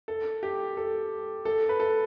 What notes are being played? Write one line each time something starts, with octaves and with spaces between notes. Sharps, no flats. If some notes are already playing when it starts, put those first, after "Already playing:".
A4
G4
A4
A4
B4
A4